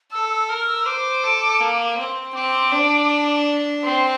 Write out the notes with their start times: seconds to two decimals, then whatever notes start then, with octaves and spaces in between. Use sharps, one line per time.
0.12 A4 E6
0.31 E6
0.49 A#4 F6
0.67 E6
0.86 C5 D6
1.24 A4
1.61 A#3
1.98 C4
2.35 C4 D6
2.72 D4
3.83 C4 C6